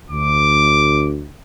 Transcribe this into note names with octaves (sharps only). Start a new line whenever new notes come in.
D2 D6